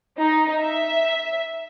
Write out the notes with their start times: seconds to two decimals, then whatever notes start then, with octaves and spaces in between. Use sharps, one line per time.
0.18 D#4
0.61 E5